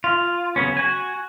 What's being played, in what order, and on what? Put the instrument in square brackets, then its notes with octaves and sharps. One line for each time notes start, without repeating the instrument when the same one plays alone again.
[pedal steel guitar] F4
C#3 F#3 B3 C#4
F#4 G#5